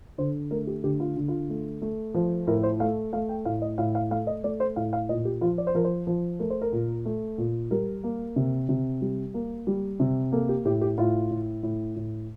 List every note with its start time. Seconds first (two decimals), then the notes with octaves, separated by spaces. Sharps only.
0.18 D3 C5
0.51 A3 A#4
0.67 G4
0.84 D3 G4
1.00 F4
1.16 D3
1.28 F4
1.50 A3
1.82 A3
2.14 F3
2.47 A2 A#4
2.63 C5
2.80 A3 F5
3.13 A3 F5
3.29 G5
3.45 A2 F5
3.62 D#5
3.78 A2 F5
3.95 F5
4.11 A3 F5
4.27 D#5
4.44 A3 D5
4.60 C5
4.76 A2 F5
4.93 F5
5.09 A#2 D#5
5.25 G4
5.41 F3 F4
5.58 D5
5.67 C5
5.75 F3 A#4
5.84 C5
6.07 F3
6.39 A3 A#4
6.50 C5
6.61 A#4
6.73 A#2
7.05 A3
7.38 A#2
7.71 G3 A#4
8.04 A#3
8.36 C3
8.69 C3
9.01 G3
9.34 A#3
9.67 G3
10.00 C3
10.32 A#3 A4
10.49 G4
10.65 A2 G4
10.81 G4
10.98 A2 F4
11.31 A2
11.63 A2
11.96 A2